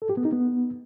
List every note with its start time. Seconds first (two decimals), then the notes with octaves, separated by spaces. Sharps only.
0.02 A4
0.10 G4
0.17 B3
0.25 D#4
0.33 B3